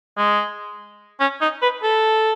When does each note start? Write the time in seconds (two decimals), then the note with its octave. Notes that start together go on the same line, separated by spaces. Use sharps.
0.17 G#3
1.20 C#4
1.41 D#4
1.62 B4
1.83 A4